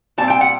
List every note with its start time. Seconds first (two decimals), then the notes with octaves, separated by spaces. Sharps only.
0.18 A#2 G3 C4 A5
0.30 G5
0.41 F#5